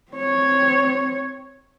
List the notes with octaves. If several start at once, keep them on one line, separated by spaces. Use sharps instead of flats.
C4 C#5